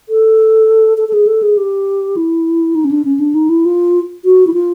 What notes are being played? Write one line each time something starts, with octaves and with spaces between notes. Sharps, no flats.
A4
A4
A4
G#4
A4
G#4
G4
E4
D#4
C#4
D4
C#4
D4
D#4
E4
F4
F#4
E4
F4